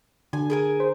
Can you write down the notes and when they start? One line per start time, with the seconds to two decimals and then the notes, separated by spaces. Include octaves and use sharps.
0.33 D3 G#5
0.50 G#4 A#4 G#5
0.80 C5